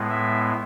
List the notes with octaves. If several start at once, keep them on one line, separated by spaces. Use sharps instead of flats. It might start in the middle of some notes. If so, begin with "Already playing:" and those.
Already playing: A2 G#3 B3
E5